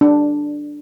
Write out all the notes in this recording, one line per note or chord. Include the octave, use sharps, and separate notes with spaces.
D4